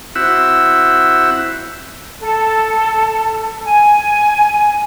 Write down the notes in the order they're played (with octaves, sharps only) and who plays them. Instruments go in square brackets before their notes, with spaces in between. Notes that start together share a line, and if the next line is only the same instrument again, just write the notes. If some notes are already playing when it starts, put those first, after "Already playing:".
[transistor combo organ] C4 E4 F#4 E5 F#5 E6
[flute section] A4
G#5